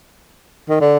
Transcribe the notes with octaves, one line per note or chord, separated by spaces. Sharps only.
D#3
D3